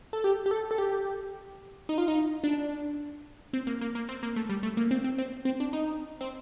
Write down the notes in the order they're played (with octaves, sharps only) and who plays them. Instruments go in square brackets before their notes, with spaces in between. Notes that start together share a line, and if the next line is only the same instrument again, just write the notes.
[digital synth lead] A4
G4
G4
A4
A4
G4
D#4
F4
D#4
D4
C4
A#3
A#3
A#3
C4
A#3
A3
G3
A3
A#3
C4
C4
C4
C4
D4
D#4
C4